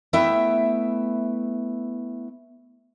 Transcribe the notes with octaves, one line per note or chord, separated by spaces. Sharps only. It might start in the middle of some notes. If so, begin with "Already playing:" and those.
A3 B3 E4 E5 G5